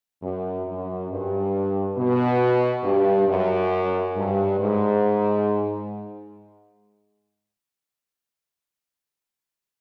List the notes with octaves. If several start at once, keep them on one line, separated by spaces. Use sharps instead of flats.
F#2
F#2
G2
B2
G2
F#2
G2
G#2